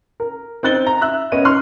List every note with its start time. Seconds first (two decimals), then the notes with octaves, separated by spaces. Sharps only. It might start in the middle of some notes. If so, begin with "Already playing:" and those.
0.20 A#4
0.63 C4 D#4 F#6 A6 G7
0.87 A#5
1.01 E5 E6 F#6
1.32 B3 C#4 D#5 D#7
1.45 C6 C#6 F6 F#6